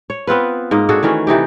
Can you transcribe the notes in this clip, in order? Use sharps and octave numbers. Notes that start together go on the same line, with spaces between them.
C#5
B3 C4 F4 B4
G#2 A#3 D#5
D4 F#4 G#4 A4
D#3 E3 A3 C#4
C3 E3 D#4 G4